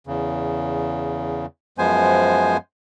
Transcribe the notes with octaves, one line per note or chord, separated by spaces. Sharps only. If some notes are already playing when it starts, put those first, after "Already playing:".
E2 C#3
F#2 F3 G#3 B3 C5 G#5